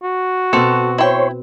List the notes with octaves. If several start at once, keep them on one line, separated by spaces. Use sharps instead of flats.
F#4
B2 C4 A4
E4 C5 C#5 G5